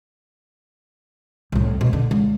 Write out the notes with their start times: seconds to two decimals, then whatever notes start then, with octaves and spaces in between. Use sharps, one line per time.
1.52 C2 A2
1.81 B2
1.93 D3
2.11 C#2